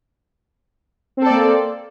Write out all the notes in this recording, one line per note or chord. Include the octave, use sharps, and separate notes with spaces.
A#3 C4 A4 D5